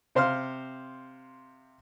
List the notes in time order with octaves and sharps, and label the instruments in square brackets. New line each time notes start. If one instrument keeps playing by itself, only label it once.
[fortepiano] C3 C5 F5 C6 F6